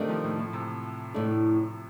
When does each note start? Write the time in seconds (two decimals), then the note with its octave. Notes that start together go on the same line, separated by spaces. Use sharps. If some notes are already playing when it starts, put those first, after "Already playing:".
Already playing: C3 D#3 A3 D4
0.09 F3
0.24 A2
0.39 A2
0.53 C3
1.14 A2 A3 D4